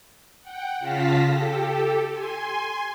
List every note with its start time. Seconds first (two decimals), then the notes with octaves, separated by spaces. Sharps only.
0.41 F#5 G5
0.79 C#3 F4 F5 A5 A#6 B6
1.25 G4 A4
2.12 G#5 C6